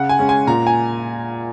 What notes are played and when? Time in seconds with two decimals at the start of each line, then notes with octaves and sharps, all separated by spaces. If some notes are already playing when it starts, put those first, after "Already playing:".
Already playing: C#3 F#5
0.09 G#5
0.19 G#3 C#4
0.29 G#5
0.47 A#2 A#5
0.67 G#5